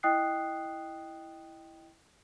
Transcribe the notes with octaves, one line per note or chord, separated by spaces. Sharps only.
E4 D#5 G5 D#6 F#6 C7